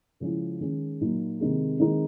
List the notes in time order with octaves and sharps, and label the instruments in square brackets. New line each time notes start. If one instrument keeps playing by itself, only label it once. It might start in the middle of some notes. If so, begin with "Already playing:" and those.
[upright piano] C#3 F3 G#3 C#4 E4
D#3 G#3 C#4
A#2 F#3 A#3 D#4
C3 D#3 G#3
D#3 G#3 C4 D#4